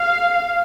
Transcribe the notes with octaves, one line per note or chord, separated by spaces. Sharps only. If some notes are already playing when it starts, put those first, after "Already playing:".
Already playing: F5